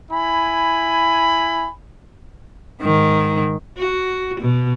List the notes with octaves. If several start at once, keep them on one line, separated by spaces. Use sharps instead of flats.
E4 G#5 B5
G#2 D#3
F#4
B2